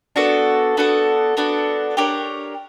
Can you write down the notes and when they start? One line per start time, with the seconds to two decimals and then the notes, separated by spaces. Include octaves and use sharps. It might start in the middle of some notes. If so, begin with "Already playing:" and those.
0.16 B3 D4 F#4 A4
0.77 B3 D4 F#4 A4
1.37 B3 D4 F#4 A4
1.97 D4 G4 A#4 C#5